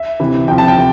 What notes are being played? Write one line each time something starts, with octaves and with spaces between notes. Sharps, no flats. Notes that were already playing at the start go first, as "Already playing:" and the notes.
Already playing: E5
C3 E3
C3 F3 G5
A5
G5
C3